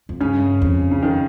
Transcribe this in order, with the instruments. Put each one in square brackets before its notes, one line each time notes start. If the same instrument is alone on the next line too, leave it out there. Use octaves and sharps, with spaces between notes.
[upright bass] F2
[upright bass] G2 [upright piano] C#3 C#4
[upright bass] F2
[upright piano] C#3
D#3